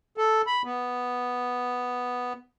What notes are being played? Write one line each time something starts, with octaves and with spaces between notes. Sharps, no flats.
A4
B5
B3